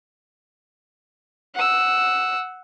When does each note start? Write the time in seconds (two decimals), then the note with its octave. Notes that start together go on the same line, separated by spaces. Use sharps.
1.54 F#5 E6